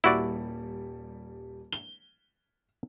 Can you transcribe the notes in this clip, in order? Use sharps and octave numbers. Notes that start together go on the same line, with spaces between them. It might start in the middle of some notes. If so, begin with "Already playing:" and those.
D#1 G3 E4 F#4 D5
G7